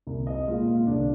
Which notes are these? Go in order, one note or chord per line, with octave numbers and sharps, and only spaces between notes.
C2
D#5
A#2 G#3 F4
F4
C2 D4